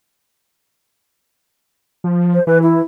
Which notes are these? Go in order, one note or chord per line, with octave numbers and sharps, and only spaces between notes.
F3
C5
E3 B4
E4